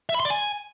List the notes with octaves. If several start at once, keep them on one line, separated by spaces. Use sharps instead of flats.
E5
B5
C6
D5
G#5